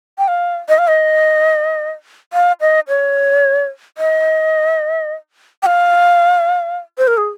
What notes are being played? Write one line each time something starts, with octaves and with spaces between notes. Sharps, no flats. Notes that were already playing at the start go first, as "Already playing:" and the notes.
G5
F5
D#5
F5
D#5
F5
D#5
C#5
D#5
G5
F5
C5
A#4
G#4